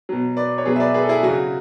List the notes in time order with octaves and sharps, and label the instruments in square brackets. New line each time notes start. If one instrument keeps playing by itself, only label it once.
[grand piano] B2 F#3
B4 D5
C#5
B2 F#3 G#4 B4
E5
B4 D5
G#4 B4
A4
E4 G#4
C#3 F#3 F#4